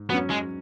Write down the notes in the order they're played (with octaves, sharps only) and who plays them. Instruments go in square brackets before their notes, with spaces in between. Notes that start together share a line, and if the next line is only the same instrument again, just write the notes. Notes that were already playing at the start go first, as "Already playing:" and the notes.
Already playing: [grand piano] G#2
[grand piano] F#3 C#4 [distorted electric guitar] B3
[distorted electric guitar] G#3